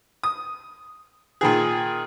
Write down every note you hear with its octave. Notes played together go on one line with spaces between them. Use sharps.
D#6
A#2 D#3 G#4